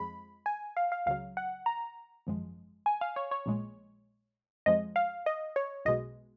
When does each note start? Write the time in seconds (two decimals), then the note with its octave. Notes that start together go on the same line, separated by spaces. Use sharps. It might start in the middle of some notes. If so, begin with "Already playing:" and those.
Already playing: F2 F3 G#3 B5
0.46 G#5
0.77 F5
0.92 F5
1.06 C#2 C#3 F#3 F5
1.37 F#5
1.66 A#5
2.27 G#1 F#2 F3 G#3
2.86 G#5
3.01 F5
3.16 C#5
3.31 C#5
3.46 A#1 A#2 G#3
4.66 F2 F3 G#3 D#5
4.96 F5
5.26 D#5
5.56 C#5
5.85 B1 B2 G#3 D#5